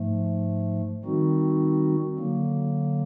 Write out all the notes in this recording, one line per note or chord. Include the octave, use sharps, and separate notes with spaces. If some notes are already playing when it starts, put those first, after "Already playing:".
Already playing: G#2 F3 A3
D#3 G3 C4 D#4 F#4
D3 F#3 A#3